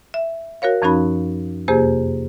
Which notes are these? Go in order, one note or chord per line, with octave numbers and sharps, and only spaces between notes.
E5
F#4 A#4 C#5 F5
F#2 F3 C#4 D#4 F#4 B5
F2 C3 A#3 G4 G#4 C5